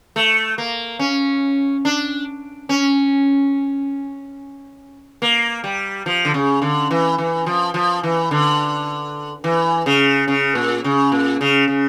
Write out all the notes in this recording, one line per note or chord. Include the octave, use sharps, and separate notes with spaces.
A3
A#3
C#4
D4
C#4
A#3
G3
F3
D3
C#3
D3
E3
E3
F3
F3
E3
D3
E3
C#3
C#3
A#2
C#3
A#2
C#3
C#3